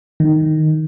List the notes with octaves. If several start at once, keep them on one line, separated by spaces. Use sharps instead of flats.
D#3